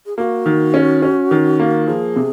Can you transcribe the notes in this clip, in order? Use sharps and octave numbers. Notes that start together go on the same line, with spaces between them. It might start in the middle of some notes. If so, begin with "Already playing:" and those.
G#4
A#3 F#4
D#3
C#4
C#4
D#3
A#3
F3 G#4
C3